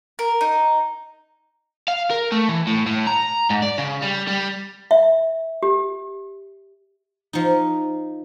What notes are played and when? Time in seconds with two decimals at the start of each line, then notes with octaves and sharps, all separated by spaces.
0.19 A#4
0.41 D#4
1.88 F5
2.11 A#4
2.32 A3
2.49 E3
2.67 A2
2.86 A2
3.07 A#5
3.50 G#2
3.62 D5
3.78 C#3
4.02 G3
4.27 G3
4.91 E5
5.63 G4
7.33 F3 D#4